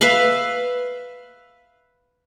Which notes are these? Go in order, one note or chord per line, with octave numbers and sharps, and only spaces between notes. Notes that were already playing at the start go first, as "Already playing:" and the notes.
B4 E5 F5 B5